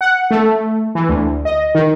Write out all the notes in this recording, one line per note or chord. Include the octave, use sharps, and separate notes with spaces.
F#5
A3
E3
D2
D#5
D#3